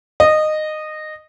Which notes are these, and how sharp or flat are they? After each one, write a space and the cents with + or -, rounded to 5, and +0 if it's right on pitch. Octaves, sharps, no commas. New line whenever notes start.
D#5 -15